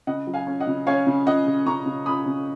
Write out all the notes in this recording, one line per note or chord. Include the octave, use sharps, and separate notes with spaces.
C#3 D#5 F#5
F#3
F5 G#5
C#4
D#5 F#5
C#3
C#4 C#5 F5
C#3
C#3 D#5 F#5
C#3
C#3 A#5 C#6
C#3
C#4 B5 D#6
C#3